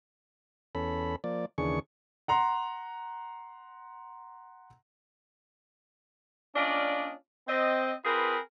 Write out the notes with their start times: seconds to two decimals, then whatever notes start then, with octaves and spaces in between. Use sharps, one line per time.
0.75 E2 C#4 A4 B5
1.24 F3 A#3 D5
1.58 D#2 C#3 E3 D4 G#4 C#6
2.28 F#5 A#5 C6
6.55 A#3 C#4 D4 F4 D5 D#5
7.48 C4 D#5
8.05 C4 F4 G#4 A#4 B4